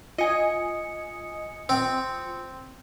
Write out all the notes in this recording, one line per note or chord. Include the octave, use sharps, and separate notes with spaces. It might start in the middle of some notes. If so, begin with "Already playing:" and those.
F4 D#5 G#5 D#6 C#7
C4